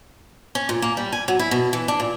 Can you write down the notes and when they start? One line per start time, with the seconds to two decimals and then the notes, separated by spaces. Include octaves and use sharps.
0.55 C#4
0.69 A#2
0.82 A#3
0.97 G3
1.13 G#5
1.28 F#3
1.39 E4
1.51 B2
1.73 E3
1.88 D4
2.00 A#2